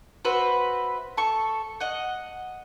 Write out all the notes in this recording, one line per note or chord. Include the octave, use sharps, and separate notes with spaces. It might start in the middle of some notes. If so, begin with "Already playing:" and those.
F#4 B4 C5 E5
A4 C#6
D#5 F#5